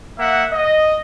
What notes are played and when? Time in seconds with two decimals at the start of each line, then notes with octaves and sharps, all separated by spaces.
0.19 A#3 E5 F#5
0.52 D#5